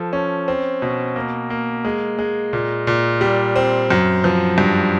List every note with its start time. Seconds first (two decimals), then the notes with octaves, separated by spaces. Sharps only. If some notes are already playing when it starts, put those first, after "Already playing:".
Already playing: F3 A4
0.13 C#4
0.48 C4
0.82 B2
1.16 A#3
1.50 A#3
1.85 G#3
2.19 G#3
2.53 A#2
2.87 A#2
3.21 G3
3.56 C4
3.91 F#2
4.24 F3
4.58 G2